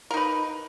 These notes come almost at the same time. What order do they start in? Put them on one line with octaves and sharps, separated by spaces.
A#4 D#4 B4